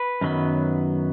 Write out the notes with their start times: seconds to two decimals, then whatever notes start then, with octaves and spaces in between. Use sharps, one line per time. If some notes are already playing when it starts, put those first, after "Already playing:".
Already playing: B4
0.21 F#2 D#3 F#3 B3